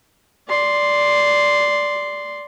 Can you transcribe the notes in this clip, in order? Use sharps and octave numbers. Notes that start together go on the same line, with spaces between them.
D5 C6